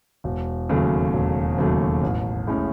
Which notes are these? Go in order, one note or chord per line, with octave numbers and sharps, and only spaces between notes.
E1
D#2 C#3 F#3 A3
E1
D#2 C#3 F#3 A3
A1
A2 G#3 C#4